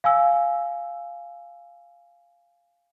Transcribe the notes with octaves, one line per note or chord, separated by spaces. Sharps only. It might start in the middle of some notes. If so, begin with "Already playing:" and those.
F5 G#5 E6